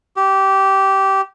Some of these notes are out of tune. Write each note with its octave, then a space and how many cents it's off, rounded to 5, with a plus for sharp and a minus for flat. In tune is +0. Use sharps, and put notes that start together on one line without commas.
G4 -15